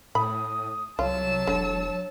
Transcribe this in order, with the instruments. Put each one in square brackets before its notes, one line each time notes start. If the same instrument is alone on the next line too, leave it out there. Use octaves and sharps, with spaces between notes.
[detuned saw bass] A2 [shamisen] B5 [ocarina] D#6
[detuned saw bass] C2 [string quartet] F#3 A5 E6 [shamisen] F4 [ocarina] C#5
[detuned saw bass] E1 [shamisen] D3